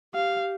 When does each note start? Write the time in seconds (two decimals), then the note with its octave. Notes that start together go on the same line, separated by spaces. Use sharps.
0.14 G4 F5